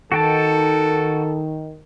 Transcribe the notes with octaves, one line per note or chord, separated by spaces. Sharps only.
D#3 F#4 A4 G5 A5